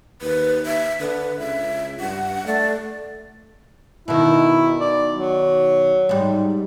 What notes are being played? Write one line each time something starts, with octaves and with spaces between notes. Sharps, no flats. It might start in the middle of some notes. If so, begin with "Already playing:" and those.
D#2 B4
E5
D3 B4
C#2 E5
G2 F#5
A3 D5
B2 D#3 E4
D5
F#3
G#2 G3